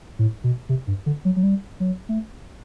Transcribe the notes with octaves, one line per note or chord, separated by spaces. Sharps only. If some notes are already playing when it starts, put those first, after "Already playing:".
A2
B2
C3
G2
D3
F#3
F#3
G3
F#3
A3